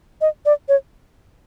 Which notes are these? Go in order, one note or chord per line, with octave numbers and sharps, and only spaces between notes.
D#5
D5
C#5